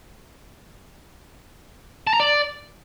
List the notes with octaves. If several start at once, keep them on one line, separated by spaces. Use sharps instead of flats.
A5
A#5
D5